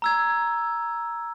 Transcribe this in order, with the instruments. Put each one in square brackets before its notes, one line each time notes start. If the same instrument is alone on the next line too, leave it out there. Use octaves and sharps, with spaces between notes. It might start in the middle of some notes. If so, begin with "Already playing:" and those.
[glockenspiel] A#5 E6 G#6